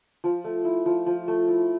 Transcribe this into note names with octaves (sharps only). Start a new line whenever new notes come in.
F3
A3
E4
F3
F3
A3
E4